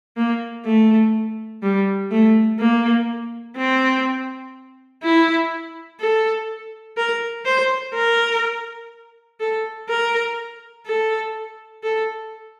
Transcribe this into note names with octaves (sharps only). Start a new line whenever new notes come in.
A#3
A3
G3
A3
A#3
C4
E4
A4
A#4
C5
A#4
A4
A#4
A4
A4